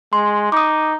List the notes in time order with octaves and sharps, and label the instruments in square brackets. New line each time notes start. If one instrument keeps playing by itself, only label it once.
[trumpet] G#3 [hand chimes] C6
[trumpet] D#4 [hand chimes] D6 D#6